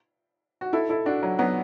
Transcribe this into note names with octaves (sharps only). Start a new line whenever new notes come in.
F#4
E4 A4
E4 A4
D4 F#4
F#3
F#3 B3